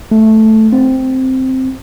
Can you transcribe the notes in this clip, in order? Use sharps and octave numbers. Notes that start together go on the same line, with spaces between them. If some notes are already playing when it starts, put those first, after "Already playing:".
A3
C4